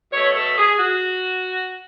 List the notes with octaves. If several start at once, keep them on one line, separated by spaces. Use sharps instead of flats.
B2 A3 C#5
A4
G#4
F#4